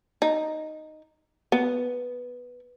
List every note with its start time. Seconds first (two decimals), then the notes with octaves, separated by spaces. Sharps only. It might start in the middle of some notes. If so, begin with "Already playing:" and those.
0.22 D#4
1.52 B3